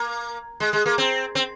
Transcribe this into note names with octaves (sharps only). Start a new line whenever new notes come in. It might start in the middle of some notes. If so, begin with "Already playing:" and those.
Already playing: A#3
G#3
G#3
A#3
C4
C4